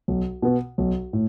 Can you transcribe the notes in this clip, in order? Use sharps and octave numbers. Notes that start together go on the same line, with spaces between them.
B1
B2 B3
B1
A2